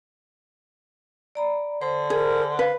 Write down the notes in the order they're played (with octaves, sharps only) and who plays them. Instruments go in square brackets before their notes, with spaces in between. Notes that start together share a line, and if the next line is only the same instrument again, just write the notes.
[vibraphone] D5 A#5 B5
[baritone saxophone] D3 [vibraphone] C5
[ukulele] G#4 [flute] A#4
[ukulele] B4 [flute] F5